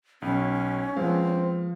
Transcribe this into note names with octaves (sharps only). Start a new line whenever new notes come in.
B1 C#4
F3 G#3 B3 C4 F5